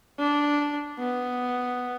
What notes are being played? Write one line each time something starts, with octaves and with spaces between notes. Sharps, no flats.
D4
B3